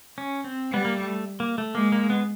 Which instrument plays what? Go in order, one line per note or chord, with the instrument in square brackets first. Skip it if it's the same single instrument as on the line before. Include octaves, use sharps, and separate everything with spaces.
[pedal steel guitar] C#4
C4
[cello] G3 [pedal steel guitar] B3
[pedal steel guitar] A#3
A3
A#3
A3
[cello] G#3 [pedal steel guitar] A#3
[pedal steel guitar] A#3
B3